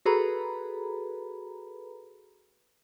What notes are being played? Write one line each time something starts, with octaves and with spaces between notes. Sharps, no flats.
F#4 G#4 A4 B4 A#5 B5